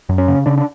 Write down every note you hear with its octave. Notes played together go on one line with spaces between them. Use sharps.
F#2
C#4
C#3
C#3 D4
D4